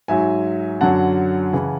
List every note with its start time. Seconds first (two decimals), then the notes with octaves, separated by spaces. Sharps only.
0.08 G#2 F#3 E5 G#5
0.81 F#2 D3 F#3 F#5 A5
1.53 C#3 E3